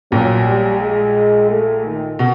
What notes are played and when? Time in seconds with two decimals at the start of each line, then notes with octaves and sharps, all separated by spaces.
0.12 A#1 A#2 F#3
0.47 G3
0.81 G#3
1.50 A3
1.85 D#3
2.19 B2